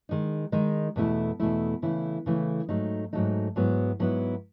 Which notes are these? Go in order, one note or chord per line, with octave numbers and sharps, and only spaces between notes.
D#3 G#3 D#4
D#3 G#3 D#4
E2 B2 A3 E4
E2 B2 A3 E4
C#3 E3 A3 E4
C#3 E3 A3 E4
G#2 F#3 A3 D#4
G#2 F#3 A3 D#4
G#2 F#3 B3 E4
G#2 F#3 B3 E4